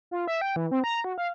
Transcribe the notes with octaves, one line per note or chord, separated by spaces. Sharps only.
F4
E5
G5
E3
C4
A#5
F#4
F5